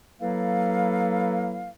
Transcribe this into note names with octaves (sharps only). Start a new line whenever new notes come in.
F#3 A#3 E4 A4 B4 F5